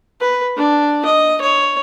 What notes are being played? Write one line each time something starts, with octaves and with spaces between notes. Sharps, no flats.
B4
D4
D#5
C#5